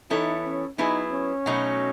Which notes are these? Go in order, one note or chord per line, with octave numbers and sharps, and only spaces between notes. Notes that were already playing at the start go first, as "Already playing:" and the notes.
E3 B3 D#4 E4 A4 C#5
C#4
F#3 B3 D#4 E4 G#4
C#4
B2 F#3 A3 D#4 F#4